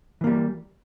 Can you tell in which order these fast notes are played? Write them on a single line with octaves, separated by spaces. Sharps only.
E3 A#3 G3